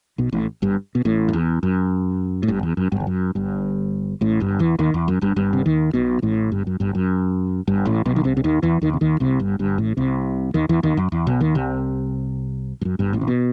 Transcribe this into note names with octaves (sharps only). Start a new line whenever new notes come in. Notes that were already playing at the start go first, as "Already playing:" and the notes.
B1 B2
A1 A2
G1 G2
B2
A1 A2
F#2
E2
F#2
A2
G1 G2
E2
F#2
G1 G2
E2
F#2
G1 G2
A1 A2
G1 G2
E2 E3
D#2 D#3
E2
F#2
G1 G2
G1 G2
C3
D#2 D#3
B1 B2
A1 A2
G1 G2
F#2
G1 G2
F#2
G1 G2
A1 A2
B1 B2
D#3
C2 C3
C3
D#2 D#3
E2 E3
D#2 D#3
C3
D#2 D#3
C2 C3
G1 G2
G1 G2
A1 A2
C2 C3
D#2 D#3
E2 E3
D#2 D#3
F#2
E2
B1 B2
D#2 D#3
C2 C3
G2
F#2
G1 G2
A1 A2
C3
B2